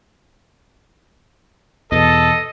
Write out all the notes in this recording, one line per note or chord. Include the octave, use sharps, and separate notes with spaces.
E2 B2 A4 D#5